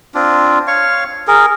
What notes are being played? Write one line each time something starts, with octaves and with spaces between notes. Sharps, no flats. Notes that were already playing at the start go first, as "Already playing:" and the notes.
C4 D4 F4
C#5 F5 C#6
G#4 A#4